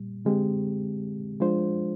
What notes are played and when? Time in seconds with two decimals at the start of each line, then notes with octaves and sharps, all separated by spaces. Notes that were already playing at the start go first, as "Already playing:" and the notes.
Already playing: A#2 G3
0.25 D3 G#3 C4 G4
1.40 F3 G#3 D4 F4 C5